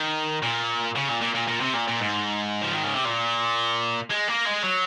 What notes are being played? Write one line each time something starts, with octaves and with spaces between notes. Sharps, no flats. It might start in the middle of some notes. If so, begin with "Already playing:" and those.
Already playing: D#3
A#2
C#3
A#2
A#2
A#2
A#2
C3
A#2
A#2
G#2
F3
D#3
C#3
C3
A#2
G#3
A#3
G#3
F#3